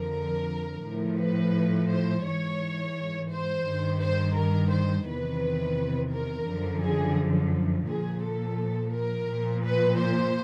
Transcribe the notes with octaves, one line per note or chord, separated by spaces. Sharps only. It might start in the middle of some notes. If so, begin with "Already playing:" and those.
Already playing: F2 D3 F3 A#4
A2 F3
B4
C5
G#2 E3 C#5
C5
G2 D#3
C5
A#4
C5
E2 C3 D#3 B4
A#4
F#2 D3 F3
G#4
A#2 F3 G#4
A4
A#4
A#2 F3
B4
C5